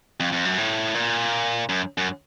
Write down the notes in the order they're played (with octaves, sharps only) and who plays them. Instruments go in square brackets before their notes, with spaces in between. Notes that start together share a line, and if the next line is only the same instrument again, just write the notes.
[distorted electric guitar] F2
F2
F#2
A2
A#2
F#2
F#2